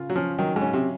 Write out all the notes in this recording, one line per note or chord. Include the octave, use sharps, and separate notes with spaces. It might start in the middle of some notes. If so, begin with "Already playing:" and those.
Already playing: C#3 F4
F#3
F3 C#4
D#3 F#3
G#2
C#4
C3